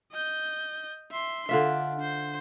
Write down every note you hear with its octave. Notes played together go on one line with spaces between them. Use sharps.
D#5 G6
E5 C6
D3 D4 F4 E5
C5